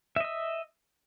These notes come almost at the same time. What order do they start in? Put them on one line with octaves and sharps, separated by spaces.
E5 D#5 E6